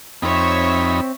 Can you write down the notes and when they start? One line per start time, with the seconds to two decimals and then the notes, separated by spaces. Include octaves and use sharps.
0.22 F2 C4 D#4 C#5 E5 B5